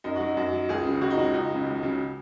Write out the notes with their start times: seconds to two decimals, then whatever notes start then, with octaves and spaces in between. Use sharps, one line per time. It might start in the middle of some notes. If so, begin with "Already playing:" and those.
0.04 F#2 D#4
0.16 F#3 F#4
0.27 D#4
0.37 F#2 F#4
0.53 F#3
0.69 C#2 G#4
0.85 C#3 F#3
1.01 C#2 F#4
1.11 D#4
1.17 C#3 F#3 F#4
1.34 C#2 D#4
1.51 C#3 F#3
1.66 C#2
1.83 C#3 F#3